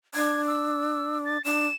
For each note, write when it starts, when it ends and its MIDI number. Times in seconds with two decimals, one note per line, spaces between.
0.15 1.37 62
0.15 0.42 92
0.47 1.18 88
1.25 1.44 93
1.44 1.66 62
1.44 1.75 100